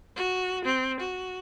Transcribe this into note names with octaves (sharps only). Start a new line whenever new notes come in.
F#4
C4
F#4